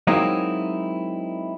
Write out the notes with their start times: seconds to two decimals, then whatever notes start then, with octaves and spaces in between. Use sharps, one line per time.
0.07 F#3 G#3 A#3 C4 D#4 E4